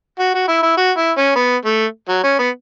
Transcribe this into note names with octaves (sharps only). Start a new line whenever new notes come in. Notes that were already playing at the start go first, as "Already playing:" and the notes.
F#4
F#4
E4
E4
F#4
E4
C#4
B3
A3
F#3
C#4
B3